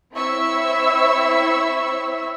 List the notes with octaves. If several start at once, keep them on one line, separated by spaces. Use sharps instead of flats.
C4 E4 C#5 E5 C#6 E6